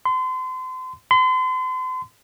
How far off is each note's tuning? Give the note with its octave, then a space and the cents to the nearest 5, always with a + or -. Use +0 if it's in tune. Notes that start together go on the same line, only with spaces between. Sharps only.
C6 -35
C6 -40